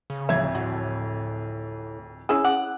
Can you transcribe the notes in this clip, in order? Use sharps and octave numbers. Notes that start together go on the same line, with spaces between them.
C#3
D1 F2 E5 G#6
A2 F#4
C#4 E4 G#4 E6
F#5 D6